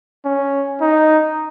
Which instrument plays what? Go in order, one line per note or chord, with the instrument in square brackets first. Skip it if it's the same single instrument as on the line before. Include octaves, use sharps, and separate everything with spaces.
[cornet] C#4
D#4